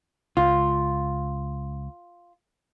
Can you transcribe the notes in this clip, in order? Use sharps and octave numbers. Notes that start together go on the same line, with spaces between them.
C#2 F4